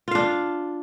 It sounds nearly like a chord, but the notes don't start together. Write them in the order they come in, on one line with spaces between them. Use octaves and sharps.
F4 F5 D4